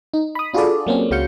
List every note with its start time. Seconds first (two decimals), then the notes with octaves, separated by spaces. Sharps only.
0.14 D#4
0.35 B5 D#6
0.54 D4 F4 F#4 G#4 A4 D5
0.87 F#3 A#3 C4 C#4
1.11 C#2 C#3 F#4 F5 G6 C#7